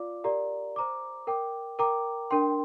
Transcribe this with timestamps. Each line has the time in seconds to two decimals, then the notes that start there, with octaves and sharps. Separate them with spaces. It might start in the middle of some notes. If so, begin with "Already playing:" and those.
Already playing: F4 D5 F5 D6
0.24 G4 A#4 D5 F5 A#5
0.76 C5 A#5 D6
1.27 A#4 G5 D6
1.79 A#4 G5 A#5 D6
2.31 D4 A#4 G5 C6